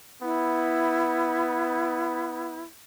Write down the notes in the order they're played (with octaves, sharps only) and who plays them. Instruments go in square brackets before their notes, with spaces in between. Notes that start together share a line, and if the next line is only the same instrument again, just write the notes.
[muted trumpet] B3 [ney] E4